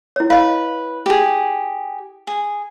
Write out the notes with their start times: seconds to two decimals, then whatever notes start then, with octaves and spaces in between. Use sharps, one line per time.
0.16 E4 C#5
0.30 B4 D#5 F5
1.06 G4 G#4
2.27 G#4